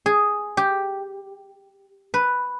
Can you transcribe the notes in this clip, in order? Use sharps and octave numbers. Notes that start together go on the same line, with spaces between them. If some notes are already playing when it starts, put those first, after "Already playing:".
G#4
G4
B4